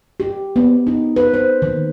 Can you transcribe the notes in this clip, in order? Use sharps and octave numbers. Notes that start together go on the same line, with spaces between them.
G4
B3
D#4
B4
C5
D#3